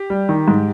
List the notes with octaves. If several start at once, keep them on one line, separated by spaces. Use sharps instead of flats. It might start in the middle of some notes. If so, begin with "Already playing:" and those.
Already playing: G4
G3
D#3
G#2